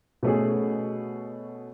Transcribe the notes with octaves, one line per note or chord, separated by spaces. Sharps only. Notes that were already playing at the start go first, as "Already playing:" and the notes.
B2 A3 C#4 G#4